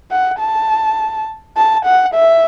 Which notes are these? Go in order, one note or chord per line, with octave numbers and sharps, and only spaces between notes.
F#5
A5
A5
F#5
E5